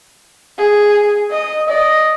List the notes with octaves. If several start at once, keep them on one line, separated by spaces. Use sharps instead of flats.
G#4
D#5 D#6
D5 D#5